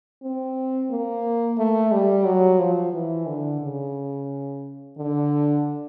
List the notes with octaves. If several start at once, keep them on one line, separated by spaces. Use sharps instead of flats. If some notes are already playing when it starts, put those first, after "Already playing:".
C4
A#3
A3
G3
F#3
F3
E3
D3
C#3
D3